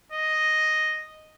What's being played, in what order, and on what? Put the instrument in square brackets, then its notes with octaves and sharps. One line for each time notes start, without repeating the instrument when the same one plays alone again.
[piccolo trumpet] D#5